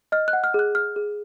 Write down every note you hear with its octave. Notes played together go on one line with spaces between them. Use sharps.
D#5 F6
F#6
F#5
F6
G#4 F#6
G#4 F6
G#4